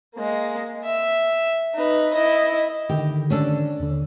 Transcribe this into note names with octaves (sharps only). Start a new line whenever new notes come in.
G#3 A#3
E5
D#4 B4
E4 D#5
D3 D#3 G4
C#4 D4 A4
D#2 D3